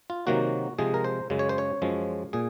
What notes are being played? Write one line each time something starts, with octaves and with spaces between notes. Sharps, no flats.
F4
C3 D#3 F#3 A#3 F#4
C3 F3 G#3 G#4
A#4
C5
F#2 C#3 G#3
C#5
C5
C#5
F#2 F3 G#3
A#2 G#4